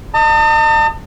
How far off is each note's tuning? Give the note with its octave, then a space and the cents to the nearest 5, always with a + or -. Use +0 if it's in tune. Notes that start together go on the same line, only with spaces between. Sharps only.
D#5 -35 A5 +45 D#6 +20